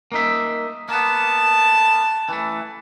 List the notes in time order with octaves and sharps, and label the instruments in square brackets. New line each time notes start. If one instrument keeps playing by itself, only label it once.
[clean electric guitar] A#3 D#4 E5
[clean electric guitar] A#3 B3 [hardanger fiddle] A5
[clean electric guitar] E3 A3